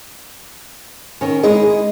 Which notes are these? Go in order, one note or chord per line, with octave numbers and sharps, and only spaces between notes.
D#3 C#4
G#3 D#4 E4 G#4 D#5